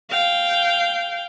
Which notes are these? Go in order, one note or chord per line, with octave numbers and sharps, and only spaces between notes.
F5 G5